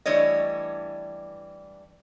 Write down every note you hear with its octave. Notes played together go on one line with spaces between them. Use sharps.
E3 G3 A3 D4 C#5 D#5